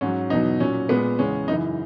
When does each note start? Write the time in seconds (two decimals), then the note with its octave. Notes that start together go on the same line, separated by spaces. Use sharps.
0.01 G#2 F#3 C#4
0.30 E2 B2 F#3 D#4
0.60 A#2 F#3 C#4
0.89 A#2 G#3 B3
1.19 E2 C#3 G#3 C#4
1.48 F#2 C#3 E3 D#4